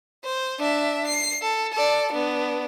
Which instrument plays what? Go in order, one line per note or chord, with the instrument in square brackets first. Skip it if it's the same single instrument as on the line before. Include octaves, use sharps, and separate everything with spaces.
[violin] C5
D4 E5
C7
A4
A4 D5
B3 D4